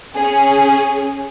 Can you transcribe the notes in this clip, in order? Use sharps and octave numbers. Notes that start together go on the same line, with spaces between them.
C#4 G#4